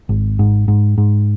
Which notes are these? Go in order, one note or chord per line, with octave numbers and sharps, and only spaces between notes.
G#1
G#2
G#2
G#2